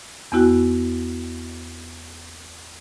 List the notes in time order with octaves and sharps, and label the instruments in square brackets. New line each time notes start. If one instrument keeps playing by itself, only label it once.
[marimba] E2 B3 E4 F#4 G5